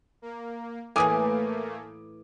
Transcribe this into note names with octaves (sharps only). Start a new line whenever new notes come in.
A#3
A2 E3 A3 A#3 B4 G#5 D6 D#6